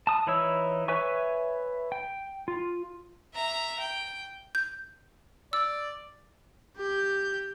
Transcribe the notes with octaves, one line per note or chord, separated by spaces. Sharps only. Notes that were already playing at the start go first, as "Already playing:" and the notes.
A5 D#6
E3 D#4 E4 C#5 E6
B4 C#5 E5 G#5 C#6
G5
F4
E5 A#5
G5
G6
D5 E6
G4 G6